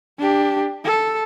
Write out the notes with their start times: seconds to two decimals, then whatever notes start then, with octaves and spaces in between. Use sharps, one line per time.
0.19 D4 G4
0.85 A4